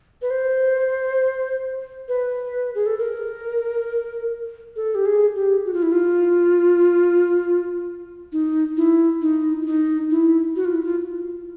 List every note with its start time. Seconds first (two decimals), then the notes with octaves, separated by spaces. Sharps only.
0.22 B4
0.30 C5
2.08 B4
2.75 G#4
2.86 A4
2.98 A#4
4.76 A4
4.95 G4
5.06 G#4
5.36 G4
5.65 F#4
5.74 F4
5.83 E4
5.92 F4
8.32 D#4
8.77 E4
9.22 D#4
9.62 E4
9.66 D#4
10.11 E4
10.56 F#4
10.65 F4
10.74 E4
10.84 F4